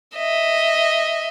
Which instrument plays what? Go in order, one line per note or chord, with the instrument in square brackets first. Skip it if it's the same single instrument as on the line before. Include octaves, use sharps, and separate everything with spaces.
[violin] D#5 E5